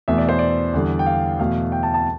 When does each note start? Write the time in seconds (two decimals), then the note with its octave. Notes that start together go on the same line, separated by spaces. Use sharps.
0.08 E2 B2 A3 E5
0.18 D5
0.29 C5
0.39 D5
0.74 E2 D3 G3
0.99 G5
1.06 F5
1.39 E2 B2 A3 F5
1.72 G5
1.83 A5
1.94 A5